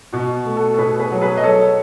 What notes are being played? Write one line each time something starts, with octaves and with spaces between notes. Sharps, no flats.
B2 F#4
A3
F#4 A4
A4
B2 G#4 B4
G#4 B4
F#3
G#4 B4
D#5
F#3 A4 C#5